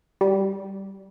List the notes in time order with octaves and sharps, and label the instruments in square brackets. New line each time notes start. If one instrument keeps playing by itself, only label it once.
[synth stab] G3